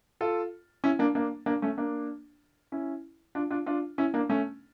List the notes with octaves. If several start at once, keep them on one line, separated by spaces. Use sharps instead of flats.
F4 A4
C#4 E4
A#3 D4
A#3 D4
A#3 D4
A3 C#4
A#3 D4
C#4 E4
D4 F4
D4 F4
D4 F4
C#4 E4
A#3 D4
A3 C#4